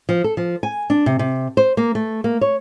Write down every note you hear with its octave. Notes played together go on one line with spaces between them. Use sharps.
F3
A4
F3
G#5
D4
C3
C3
C5
A#3
A3
A#3
C#5